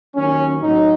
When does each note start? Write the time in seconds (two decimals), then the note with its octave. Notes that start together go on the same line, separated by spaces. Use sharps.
0.14 D#2 D#3 F#3 C#4
0.61 A2 F#3 D#4